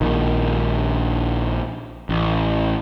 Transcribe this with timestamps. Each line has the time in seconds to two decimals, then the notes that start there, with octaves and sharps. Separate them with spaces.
0.01 A#1 D#3
2.09 A1